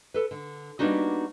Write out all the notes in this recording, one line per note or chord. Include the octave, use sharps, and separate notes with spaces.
A4 B4
D3
G3 A#3 B3 D4 D#4 F#4